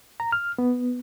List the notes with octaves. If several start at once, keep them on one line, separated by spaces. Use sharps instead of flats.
A#5
F6
B3